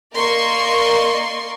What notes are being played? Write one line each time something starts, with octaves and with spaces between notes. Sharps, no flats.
A#3 A#4 D5 D#5 C6 C#6